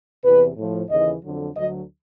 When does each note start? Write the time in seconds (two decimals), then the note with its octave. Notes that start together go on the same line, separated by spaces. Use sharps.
0.23 E2 C3 E3 B4
0.56 A2 F3
0.89 D#2 C#3 E3 D#5
1.22 F2 D3 F#3
1.55 D2 D3 F#3 D#5